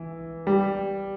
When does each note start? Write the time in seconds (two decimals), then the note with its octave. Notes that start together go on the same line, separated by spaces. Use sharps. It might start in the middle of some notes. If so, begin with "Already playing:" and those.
Already playing: E3
0.47 G3